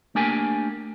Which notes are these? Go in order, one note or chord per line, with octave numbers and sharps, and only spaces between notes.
A3 A#3 D4 G4 A#4 G#5